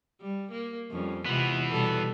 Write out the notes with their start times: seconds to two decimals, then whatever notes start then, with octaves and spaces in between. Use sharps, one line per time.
0.21 G3
0.51 A#3
0.91 F2 G3 C#4
1.25 C3 E3 G#3 B3 F4
1.69 B2 G3 A4